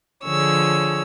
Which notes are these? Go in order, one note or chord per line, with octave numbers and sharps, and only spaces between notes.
D3 F3 G#4 C#5 E6